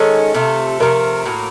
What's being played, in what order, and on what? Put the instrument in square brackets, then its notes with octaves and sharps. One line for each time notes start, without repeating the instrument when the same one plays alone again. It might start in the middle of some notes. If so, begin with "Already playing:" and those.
Already playing: [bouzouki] D#3 G#3 C#4 [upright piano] A4
[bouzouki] C3 F3 A3
[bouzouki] C3 F3 A3 [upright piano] A#4
[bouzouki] A2 F#3 A#3